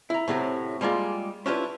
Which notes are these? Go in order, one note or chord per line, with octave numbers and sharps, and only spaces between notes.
E4 A#5
A2 C3 F#3 C4
G3 G#3 A#3 F4
C#4 D4 E4 F4 G4 B4